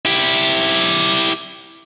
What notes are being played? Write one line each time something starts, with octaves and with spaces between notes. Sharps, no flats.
E4 G4